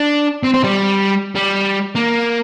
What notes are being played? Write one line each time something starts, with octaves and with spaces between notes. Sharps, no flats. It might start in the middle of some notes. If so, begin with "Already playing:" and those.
Already playing: D4
C4
C4
G3
G3
A#3